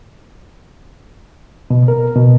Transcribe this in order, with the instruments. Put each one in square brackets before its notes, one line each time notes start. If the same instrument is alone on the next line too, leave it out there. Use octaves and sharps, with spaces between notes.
[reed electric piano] B2
A#4
B2